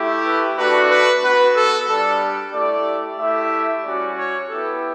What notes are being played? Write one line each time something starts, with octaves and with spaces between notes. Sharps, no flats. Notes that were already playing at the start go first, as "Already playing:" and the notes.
Already playing: A3 E4 G4
B4
A3 D4 F#4 B4
B4
B3 F#4 B4
A4
G3 D4 G4 A4
A3 E4 G4 D5
A3 E4 G4 E5
G3 C#4 F#4 D5
C#5
B3 E4 G4 A4